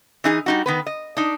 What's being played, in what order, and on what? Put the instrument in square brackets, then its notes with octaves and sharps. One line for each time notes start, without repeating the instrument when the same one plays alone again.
[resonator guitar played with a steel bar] E3 D#4 G#4
G3 D#4 F#4
D#3 B3 B4
D#5
D4 D#4